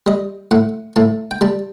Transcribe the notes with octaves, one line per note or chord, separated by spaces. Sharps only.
G3 D#5
A2 F#5
A2 A5
G5
G3 A5